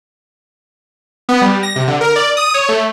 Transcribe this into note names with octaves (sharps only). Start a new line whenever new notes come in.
B3
G3
A#6
C3
D3
A#4
D5
D#6
C#5
A3